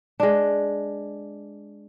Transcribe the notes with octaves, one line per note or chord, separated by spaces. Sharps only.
G#3 D4